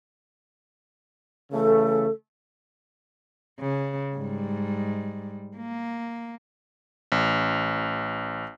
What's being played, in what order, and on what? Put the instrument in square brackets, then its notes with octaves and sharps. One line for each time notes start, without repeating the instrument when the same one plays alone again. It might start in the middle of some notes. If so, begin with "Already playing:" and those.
[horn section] C#3 E3 A3 [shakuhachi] A4
[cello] C#3
G#2 G3
A#3
[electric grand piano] A1